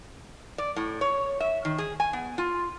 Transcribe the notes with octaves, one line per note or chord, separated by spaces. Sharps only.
D5
A2
C#5
E5
D#3
G#4
G#5
B3
F4